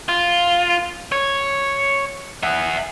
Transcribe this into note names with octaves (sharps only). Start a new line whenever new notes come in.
F4
C#5
E5 F#5